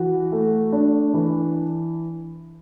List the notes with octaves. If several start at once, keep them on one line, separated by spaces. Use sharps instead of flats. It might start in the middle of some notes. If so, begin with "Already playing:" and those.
Already playing: E3 F#4
A3
D4
E3